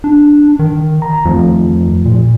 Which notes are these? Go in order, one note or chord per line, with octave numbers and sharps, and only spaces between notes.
D4
D#3
A#5
F2 D#3 F3 A3
A#2